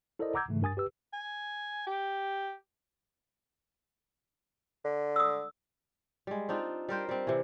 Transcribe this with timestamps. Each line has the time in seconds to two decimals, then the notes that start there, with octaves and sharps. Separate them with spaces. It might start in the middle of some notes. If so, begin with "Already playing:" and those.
0.19 E4 A4 A#4 C5 D5 D#5
0.34 F#5 A#5 D6 E6 G6 G#6
0.48 G#2 C#3 E3 A3
0.62 G2 A#4 G#5 D#6 A6
0.77 G4 B4 E6
1.13 G#5
1.87 G4
4.85 D3
5.16 D#6 E6
6.27 G3 G#3
6.49 C4 D4 D#4 F4
6.89 G3 A#4 C5 G5
7.09 G3 C4
7.27 C3 E3